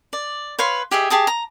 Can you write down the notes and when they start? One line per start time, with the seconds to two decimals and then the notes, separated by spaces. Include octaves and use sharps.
0.13 D5
0.59 B4 C#5 F5 C6
0.91 G4 G#4 D#5 E5
1.10 G4 G#4 A5 D#6
1.27 A#5